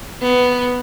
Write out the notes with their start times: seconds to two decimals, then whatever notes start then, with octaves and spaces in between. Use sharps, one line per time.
0.21 B3